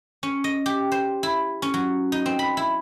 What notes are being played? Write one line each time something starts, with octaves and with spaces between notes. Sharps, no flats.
C#4
D#5
G4
C5
E4
C#4
F#3
D#4
C4
B5
E4